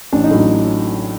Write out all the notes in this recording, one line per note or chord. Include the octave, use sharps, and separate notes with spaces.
A1 D4
D#4
A2 F#3 D4